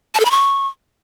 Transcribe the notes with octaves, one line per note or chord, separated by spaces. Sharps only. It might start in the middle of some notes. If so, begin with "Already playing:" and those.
A5
A4
B5
C#6